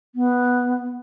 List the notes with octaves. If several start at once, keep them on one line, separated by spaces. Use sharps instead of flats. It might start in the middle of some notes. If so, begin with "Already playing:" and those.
B3